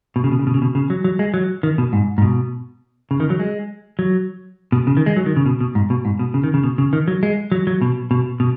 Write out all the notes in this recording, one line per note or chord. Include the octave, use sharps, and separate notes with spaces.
B2
C#3
B2
C#3
B2
C#3
B2
C#3
F#3
F#3
G#3
F#3
D#3
B2
G#2
G#2
B2
C#3
D#3
F#3
G#3
F#3
B2
C#3
D#3
G#3
F#3
D#3
C#3
B2
B2
G#2
B2
G#2
B2
C#3
D#3
C#3
B2
C#3
D#3
F#3
G#3
F#3
F#3
B2
B2
B2